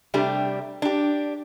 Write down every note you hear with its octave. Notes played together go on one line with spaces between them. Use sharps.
C3 G3 A3 D4 G4
D4 G4